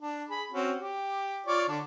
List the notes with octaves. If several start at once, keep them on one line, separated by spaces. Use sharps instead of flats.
D4
G#4 B5
C4 C#4 F#4
G4
F4 C#5 D5
D3 D4